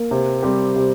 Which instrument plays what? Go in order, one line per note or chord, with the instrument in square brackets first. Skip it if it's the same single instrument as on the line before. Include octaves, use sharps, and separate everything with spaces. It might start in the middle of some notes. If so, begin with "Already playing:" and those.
Already playing: [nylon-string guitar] A#3
[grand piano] C3
G3 C4 G4
C3